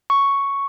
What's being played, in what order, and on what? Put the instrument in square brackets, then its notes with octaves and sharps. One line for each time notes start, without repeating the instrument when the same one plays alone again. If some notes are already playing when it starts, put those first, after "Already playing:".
[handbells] C#6